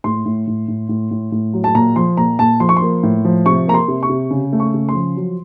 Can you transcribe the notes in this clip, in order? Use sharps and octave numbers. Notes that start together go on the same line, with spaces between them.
A2 C6
A2
A2
A2
A2
A2
A2
F#3
A5
A#2 A#5
F3 C6
A#2 A#5
A#2 A5
F3 C6
C#6
C6
A#3
A2
F3
C3 C#6
A#3 A#5
C6
C3
C#6
C3
C#3
A3
C#6
C#3
C6
F3
F#3